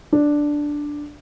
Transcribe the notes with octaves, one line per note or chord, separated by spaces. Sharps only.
D4